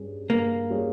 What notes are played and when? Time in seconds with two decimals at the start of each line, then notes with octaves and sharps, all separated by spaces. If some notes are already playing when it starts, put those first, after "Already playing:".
Already playing: G2 G3 C#4 G#4
0.30 G2 A#3
0.70 G3 C#4 G#4